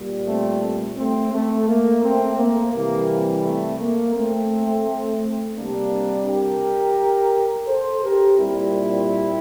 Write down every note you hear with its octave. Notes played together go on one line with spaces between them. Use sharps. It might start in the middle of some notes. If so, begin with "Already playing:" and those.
Already playing: A#2 G3
A3 C4
A3 C4
A3
A#3
A3 C4
A#3
C3 E3 G3 A#3
A3
A#3
A3 C4
C3 G3 A#3 D4
G4 A#4
A4 C5
G4 A#4
A#2 G3 C4 E4